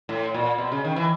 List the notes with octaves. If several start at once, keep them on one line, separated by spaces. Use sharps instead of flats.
A2
A#2
B2
C#3
D#3
E3